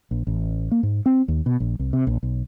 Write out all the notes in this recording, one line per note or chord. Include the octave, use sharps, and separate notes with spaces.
A#1
A1
A#3
G#2
C4
D#2
B2
A#1
C2
C3
A#1
B1